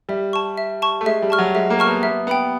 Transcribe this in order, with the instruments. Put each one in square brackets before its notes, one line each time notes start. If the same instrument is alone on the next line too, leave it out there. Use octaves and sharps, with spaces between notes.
[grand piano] G3 [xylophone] E5
[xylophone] A5 C#6
E5
A5 C#6
[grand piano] A3
[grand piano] G#3 [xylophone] E5
[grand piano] G3
[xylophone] A5 C#6 F6
[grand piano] F#3
[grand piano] G#3 [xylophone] E5
[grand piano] A#3
[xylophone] A5 C#6 F6
[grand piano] B3
[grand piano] B3 [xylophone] E5
[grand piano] B3 [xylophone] G5 B5 D#6